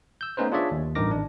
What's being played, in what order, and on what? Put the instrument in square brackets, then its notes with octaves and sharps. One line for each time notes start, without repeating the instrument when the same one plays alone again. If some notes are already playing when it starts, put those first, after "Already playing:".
[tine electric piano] E6 G6
A3 B3 C#4 D#4 B4 C5
D4 F4 G#4 C#5 D5 E5
D#2
A1 G2 D#4 A#4 D6 A#6
G#1 D4